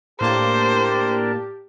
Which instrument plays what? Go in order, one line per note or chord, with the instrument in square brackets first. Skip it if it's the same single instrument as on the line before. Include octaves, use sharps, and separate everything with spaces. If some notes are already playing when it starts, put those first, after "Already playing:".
[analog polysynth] A2 A#3 A5 [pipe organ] D4 A#4 D5 [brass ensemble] G4 [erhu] C5